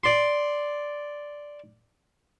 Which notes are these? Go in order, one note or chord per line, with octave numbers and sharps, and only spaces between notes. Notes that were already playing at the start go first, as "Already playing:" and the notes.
D5 C6